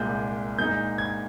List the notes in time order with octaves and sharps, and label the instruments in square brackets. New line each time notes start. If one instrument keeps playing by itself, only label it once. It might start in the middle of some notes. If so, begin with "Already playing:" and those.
Already playing: [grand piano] C2 A#2 G#3 G6
A#2 G#3 D#4 G6
G#6